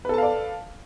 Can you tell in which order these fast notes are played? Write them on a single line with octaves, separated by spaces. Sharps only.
B4 A4 A5 F5 D5